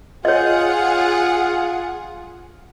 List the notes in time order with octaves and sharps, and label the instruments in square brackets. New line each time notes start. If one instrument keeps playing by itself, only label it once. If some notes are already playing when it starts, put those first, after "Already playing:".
[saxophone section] F4 [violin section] G#4 F#5 [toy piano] C#5 D#5